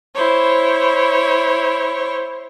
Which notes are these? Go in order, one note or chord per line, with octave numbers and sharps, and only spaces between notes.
E4 C5 C#5